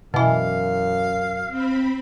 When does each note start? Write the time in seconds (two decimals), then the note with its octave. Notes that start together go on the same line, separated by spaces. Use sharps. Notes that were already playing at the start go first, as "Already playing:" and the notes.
0.14 F#2 B2 E3 F5
1.48 C4 B5